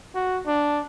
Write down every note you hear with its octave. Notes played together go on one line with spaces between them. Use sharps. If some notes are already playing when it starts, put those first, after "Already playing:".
F#4
D4